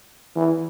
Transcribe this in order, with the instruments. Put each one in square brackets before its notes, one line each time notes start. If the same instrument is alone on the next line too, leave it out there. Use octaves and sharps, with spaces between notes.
[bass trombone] E3